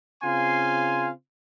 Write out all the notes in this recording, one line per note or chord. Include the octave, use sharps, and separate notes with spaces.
C#3 C4 F4 F5 G#5 C6